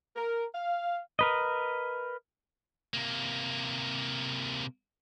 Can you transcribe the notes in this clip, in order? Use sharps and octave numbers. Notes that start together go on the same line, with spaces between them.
A#4
F5
A#4 B4 D#5
C3 A#3